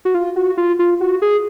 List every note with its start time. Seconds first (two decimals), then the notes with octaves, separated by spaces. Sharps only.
0.05 F#4
0.14 F4
0.36 F#4
0.57 F4
0.79 F4
1.01 F#4
1.22 G#4